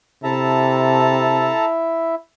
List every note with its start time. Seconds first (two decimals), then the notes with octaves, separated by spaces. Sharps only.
0.24 C3 E4 A4 E5 A5 A#5